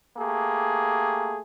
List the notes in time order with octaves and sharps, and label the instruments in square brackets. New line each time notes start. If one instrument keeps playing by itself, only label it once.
[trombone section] A3 A#3 G4 G#4